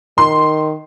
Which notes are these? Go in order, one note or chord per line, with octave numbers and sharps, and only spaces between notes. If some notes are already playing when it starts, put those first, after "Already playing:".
D#3 C6